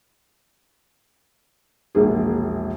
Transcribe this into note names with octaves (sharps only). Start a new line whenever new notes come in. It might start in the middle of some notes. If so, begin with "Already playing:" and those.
E1 A#1 A#3 G#4